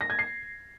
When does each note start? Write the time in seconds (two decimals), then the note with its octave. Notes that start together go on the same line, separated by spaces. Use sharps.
0.01 A#6
0.10 G#6
0.19 C7